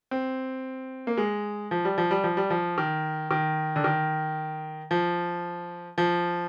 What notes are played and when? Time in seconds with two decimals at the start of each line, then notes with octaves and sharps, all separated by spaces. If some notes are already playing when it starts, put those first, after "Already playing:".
0.11 C4
1.07 A#3
1.18 G#3
1.71 F3
1.85 G3
1.98 F3
2.11 G3
2.24 F3
2.37 G3
2.50 F3
2.78 D#3
3.31 D#3
3.76 D3
3.84 D#3
4.91 F3
5.98 F3